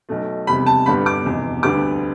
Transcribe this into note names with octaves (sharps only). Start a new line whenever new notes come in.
B1 B2 A3
F1 E2 C3 G3 B5
A5
G1 G2 D3 G3 B3 B5
D6
F1 E2 B2
D2 D3 G3 B3 D6